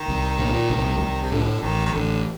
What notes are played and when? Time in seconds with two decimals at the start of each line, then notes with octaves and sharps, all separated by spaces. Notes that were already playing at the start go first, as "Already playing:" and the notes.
Already playing: D#3
0.08 C2
0.38 A#2
0.70 C2
1.00 C2
1.22 C3
1.31 A2 D3
1.62 A1 D#3
1.86 D#3
1.93 A1 D3